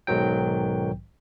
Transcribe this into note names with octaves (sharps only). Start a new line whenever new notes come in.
B1 G#2 D#3 F#3 G5